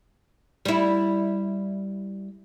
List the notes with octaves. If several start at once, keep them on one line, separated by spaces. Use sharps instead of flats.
G3 E4